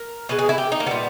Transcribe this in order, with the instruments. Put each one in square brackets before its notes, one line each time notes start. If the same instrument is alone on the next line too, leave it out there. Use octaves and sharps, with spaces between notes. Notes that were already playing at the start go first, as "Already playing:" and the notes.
Already playing: [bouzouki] A#4
B2 G#3 B4
G#4
E4
G4
D#4
A#3
A#2 G3 B3